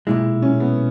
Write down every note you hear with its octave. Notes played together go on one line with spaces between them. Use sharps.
B1 A#2 G#3 E4
C#4
B3